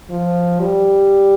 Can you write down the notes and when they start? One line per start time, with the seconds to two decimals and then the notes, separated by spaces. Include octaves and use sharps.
0.10 F3
0.61 G3